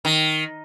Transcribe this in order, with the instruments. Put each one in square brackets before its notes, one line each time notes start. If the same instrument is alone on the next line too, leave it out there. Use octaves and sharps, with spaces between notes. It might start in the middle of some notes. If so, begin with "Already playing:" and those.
[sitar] D#3